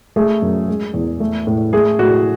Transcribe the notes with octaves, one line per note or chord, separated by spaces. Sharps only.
A3 G#4
F#2
G#3
E2
A3
A2
A3 G#4
A2 F#4